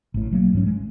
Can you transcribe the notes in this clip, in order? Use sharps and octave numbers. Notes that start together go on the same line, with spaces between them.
A1 A2
B1 F#3 A#3
G#2 F3 F#3 C#4
G#3